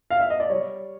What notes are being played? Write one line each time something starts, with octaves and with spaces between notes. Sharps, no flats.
F5
E5
D#5
D5
G3 C#5